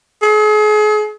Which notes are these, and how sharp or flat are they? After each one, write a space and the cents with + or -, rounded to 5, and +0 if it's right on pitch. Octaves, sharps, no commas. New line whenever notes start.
G#4 +40